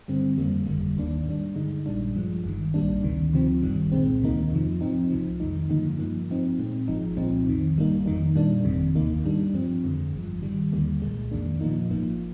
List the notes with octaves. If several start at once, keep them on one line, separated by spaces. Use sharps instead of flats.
G2 D3 G3 C4
F2 D3 G3 A#3
G1 F2 D3 G3
D#2 D#3 A#3 D4
G#2 G3 D4
G2 D3 G#3 D#4
A#1 A#2 G3 D4
G2 F3 G#3
G1 G2 D#3
A#1 G#2 G3 A#3 D4
D2 C3 D#3
D2 C3 F3 C4
G#1 G2 D#3 G3
C2 A#2 G#3 C4
D2 C3 D#3 A#3 D#4
F2 C3 F3
G#2 F3 C4 D#4
C2 C3 F3
F2 D#3 G#3 D#4
G2 D3 F3 A#3 D#4
G2 F3 A#3
G#2 F3 C4 D#4
A#2 G#3 C4
G#1 G#2 F3 G#3 D#4
C2 A#2 F3 C4 D#4
F2 C3 D#3
G#1 G#2 G3 A#3 D#4
F2 D#3 A#3 D#4
A#2 G3 A#3 D4
G1 F2 C3 D#3
D#2 D#3 A#3 D#4
G#2 G3 D4
G2 F3 C4
F2 D3 G#3
G#1 G2 F3
G#2 D#3 G3
D#2 D3 G3 A#3
C2 A#2 G#3
F2 D#3 A#3 D4
A#2 F3 A#3 D#4
G#1 G#2 F3 A#3